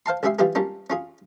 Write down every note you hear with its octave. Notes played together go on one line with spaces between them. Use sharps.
C5 F5 A5 C6
C#2 C#3 G4 G#4 E5 C6
E3 G3 E4 F4 G4 G#4
G3 A#3 C#4 D4 F4
C#4 F4 G#4